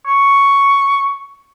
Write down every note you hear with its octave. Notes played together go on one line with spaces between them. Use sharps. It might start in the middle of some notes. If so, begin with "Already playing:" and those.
C#6